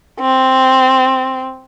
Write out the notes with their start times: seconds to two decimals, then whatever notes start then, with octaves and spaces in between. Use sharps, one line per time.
0.21 C4